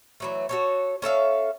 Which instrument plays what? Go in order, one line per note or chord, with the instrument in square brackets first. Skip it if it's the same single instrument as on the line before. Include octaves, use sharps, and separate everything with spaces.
[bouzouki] E3 F#3 A3
F#4 A4 C#5
C#4 A4 E5 F5